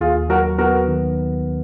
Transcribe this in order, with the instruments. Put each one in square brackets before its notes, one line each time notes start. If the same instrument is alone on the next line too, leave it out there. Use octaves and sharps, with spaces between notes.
[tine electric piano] D#2 [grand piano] F4 G#4
[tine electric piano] F#3 [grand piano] F#4 A#4
[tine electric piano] B3 [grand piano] F#4 A#4
[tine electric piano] D#3